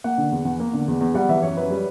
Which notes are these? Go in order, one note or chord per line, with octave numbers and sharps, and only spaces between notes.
A#3 F#5
D3
E2
E2
A#3
D3
E2
E2
G3 F#5
E3 E5
F#2 C#5
F#2 B4
G3